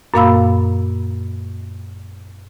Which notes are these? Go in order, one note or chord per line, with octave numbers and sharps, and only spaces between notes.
F#2 A#2 A#3 F5 B5 E6